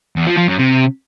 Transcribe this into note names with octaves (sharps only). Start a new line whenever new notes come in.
E2
F3
F3
F#2
C3